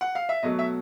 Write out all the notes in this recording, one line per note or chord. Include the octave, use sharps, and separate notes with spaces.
F#5
F5
E5
B2 F#3 A3 D#5
E5